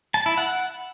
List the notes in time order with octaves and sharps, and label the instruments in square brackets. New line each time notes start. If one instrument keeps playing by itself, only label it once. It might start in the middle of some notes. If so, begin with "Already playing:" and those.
[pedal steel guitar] A5
E4
F#5